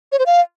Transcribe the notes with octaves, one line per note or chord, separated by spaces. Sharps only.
C#5
C5
F5